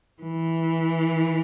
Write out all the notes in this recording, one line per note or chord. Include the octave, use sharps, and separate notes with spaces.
E3